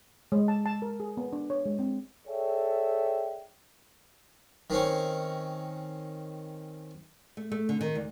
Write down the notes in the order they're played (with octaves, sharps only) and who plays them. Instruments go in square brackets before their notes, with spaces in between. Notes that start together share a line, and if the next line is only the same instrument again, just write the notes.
[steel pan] G#3
A5
A5
A#4
G#4
B3
D4
C#5
G#3
C4
[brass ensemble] G#4 A4 C#5 D5 E5 G5
[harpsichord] D#3 C4 C#4
[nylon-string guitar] A3
A3
D3
D#3
D2